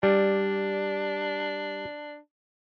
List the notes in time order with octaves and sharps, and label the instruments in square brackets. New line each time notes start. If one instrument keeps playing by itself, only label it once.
[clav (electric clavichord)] G3 [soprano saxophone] D4